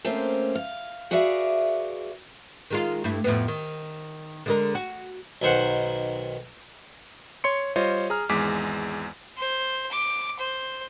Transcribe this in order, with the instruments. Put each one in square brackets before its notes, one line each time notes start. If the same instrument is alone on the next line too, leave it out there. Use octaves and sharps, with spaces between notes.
[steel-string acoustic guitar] A3 A#3 C4 C#4 C5
F5
F#4 G#4 B4 D5 E5 F5
[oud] D#3 G#3 F4
G2 A3 E4
F2 A2 B3
D#3
D3 G#3 A#4
F#4
[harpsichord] B1 D#3 C5 F#5
[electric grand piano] C#5 C6 C#7
G3 F4 C5 C#5 D#5
G#4 A#5 F6
G#1 E2 G#3 D6 B6
[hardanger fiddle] C5
D6
C5